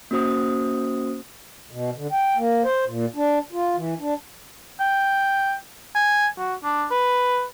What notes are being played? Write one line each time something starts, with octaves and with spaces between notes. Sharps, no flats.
A#3 C#4 F#4 C5 D#6
B2
D3
G5
A#3
C5
A#2
D4
F4
E3
D4
G5
G#5
F#4
D4
B4